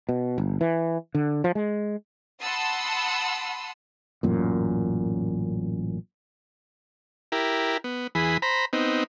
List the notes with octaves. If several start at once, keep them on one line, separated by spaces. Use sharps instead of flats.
B2
G1
E3
D3
F3
G#3
F#5 A5 B5 C6 D#6 E6
A1 F#2 A#2
E4 G4 A#4
B3
E2 E3 G#4 B5
C5 A#5 B5
B3 C4 D#4